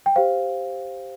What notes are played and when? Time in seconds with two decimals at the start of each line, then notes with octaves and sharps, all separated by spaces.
0.06 G5
0.16 G4 C5 F5